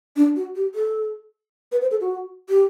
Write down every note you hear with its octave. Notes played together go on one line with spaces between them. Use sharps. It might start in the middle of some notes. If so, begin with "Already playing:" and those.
D4
F#4
G4
A4
B4
C5
A4
F#4
G4